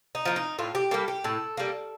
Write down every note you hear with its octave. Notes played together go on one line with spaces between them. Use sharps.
D#4
F3 A#3
D#4
A2 F4
G4
G3 A#3 A4
G4
A2 A4
G3 A#3